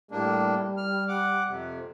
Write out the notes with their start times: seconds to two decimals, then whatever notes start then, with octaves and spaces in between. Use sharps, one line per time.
0.11 A2 G3 A#3 D4
0.77 F6
1.08 F#5 D6
1.48 F2 C3